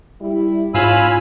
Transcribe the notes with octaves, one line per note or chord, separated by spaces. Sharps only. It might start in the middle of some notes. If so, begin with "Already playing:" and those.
G3 E4
G#2 C#4 F4 G#5 B5 E6